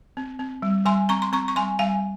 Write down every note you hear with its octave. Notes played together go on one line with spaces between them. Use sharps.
C4
C4
G3
G3 G#5 C6
C4 A#5 C#6
C6
C4 A#5 C#6
C#6
G3 G#5 C6
G3 F5 G#5